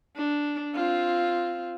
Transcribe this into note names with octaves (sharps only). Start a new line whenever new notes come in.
D4
C4 F4